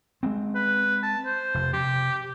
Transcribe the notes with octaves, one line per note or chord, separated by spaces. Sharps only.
G#3 B3 C4
B4
A5
C5
F1
C3 G4